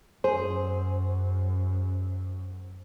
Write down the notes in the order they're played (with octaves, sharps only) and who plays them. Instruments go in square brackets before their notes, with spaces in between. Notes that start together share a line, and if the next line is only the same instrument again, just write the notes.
[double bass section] F#2 [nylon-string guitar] G#4 [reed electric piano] C5